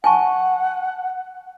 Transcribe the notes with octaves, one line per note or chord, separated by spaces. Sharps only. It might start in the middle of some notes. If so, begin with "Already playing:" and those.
F#5 G#5 A5 C#6